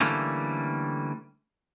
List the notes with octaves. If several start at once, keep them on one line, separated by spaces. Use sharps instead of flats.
D3 E3 G3 A3 A#3 C#4